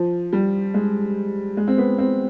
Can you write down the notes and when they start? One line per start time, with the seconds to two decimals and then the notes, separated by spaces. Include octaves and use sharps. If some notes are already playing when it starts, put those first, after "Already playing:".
Already playing: F3
0.33 G3
0.74 G#3
1.57 G#3
1.68 C4
1.78 B3
1.98 C4